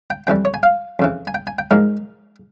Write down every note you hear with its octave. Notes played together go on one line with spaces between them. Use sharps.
G5
F2 E3 G3 G5
C#5
G#5
F5
F2 C#3 E3
G#5
G5
G#5
G5
G#2 F3 G#3 A#4